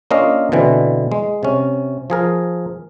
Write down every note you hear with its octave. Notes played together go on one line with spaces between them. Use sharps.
A#3 C#4 D4 F4 D#5 F5
B2 D3 E3 C4
G#3
C3 C#4
F3 G#4 A#4